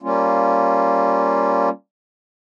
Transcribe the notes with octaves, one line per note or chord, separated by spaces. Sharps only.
G3 A#3 C#4 F4